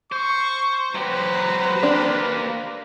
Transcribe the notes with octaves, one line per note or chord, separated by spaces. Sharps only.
C5 C#6
F#3 G4 B4 C5 A#5
A#3 D4 G4